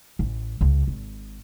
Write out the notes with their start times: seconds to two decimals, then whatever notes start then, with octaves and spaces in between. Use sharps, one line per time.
0.19 A1
0.61 C#2
0.87 G#1